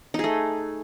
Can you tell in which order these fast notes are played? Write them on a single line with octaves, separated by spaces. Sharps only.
D#4 G#4 A3